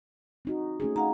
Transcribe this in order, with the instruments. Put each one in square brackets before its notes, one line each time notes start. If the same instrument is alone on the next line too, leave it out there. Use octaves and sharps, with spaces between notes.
[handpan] C4 D#4 F#4
A3 C#4 G#4
[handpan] D#4 [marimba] F5 F#5 A#5